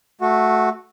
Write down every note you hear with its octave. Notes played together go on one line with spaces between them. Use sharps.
A3 F#4